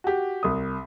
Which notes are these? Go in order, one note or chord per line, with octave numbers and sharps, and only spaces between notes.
F#4 G4
C2 D#6